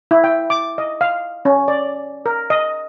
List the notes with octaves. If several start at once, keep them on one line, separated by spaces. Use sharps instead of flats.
E4
G5
D6
D#5
F5
C#4
D5
A#4
D#5